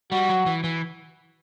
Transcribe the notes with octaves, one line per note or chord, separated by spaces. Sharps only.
G3 F#4
F#3
E3
E3